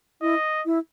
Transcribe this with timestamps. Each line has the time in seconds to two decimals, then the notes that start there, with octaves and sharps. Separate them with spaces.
0.22 E4 D#5
0.66 E4